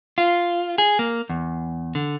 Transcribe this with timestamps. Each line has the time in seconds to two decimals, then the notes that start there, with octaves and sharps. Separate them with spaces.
0.18 F4
0.78 G#4
0.99 A#3
1.29 E2
1.95 D3